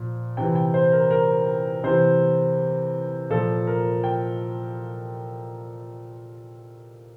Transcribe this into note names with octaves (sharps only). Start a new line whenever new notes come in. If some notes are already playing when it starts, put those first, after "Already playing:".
Already playing: A#2 F3
C3 E3 G5
G5
C5
A#4
A#4
C3 E3 C5
A#2 F3 A4
A#4
G5